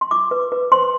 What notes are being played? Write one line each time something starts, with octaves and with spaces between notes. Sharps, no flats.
C6
F4 D6
B4
B4
C5 C6